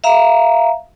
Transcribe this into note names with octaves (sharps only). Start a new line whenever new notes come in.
E5 F5 A#5